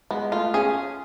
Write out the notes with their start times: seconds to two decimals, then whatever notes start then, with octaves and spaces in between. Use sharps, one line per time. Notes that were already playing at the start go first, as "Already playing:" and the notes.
0.11 G#3 B3
0.32 A3 F4
0.54 C#4 G#4